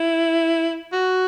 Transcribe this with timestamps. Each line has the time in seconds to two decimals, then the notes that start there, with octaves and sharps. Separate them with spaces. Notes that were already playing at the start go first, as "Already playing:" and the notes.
Already playing: E4
0.92 F#4